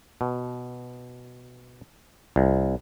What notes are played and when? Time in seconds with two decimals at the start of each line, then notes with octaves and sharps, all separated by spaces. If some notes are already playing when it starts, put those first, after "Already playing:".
0.21 B2
2.36 C2